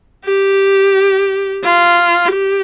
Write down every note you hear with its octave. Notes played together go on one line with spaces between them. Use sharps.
G4
F4
G4